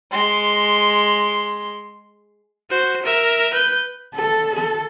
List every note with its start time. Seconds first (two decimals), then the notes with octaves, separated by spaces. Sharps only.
0.11 G#3 C6
2.70 F#4 C5
3.03 A#4 E5
3.53 B4 G6
4.15 A4
4.56 A4